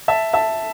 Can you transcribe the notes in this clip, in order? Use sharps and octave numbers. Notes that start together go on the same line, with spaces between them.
E5 A5
E5 A5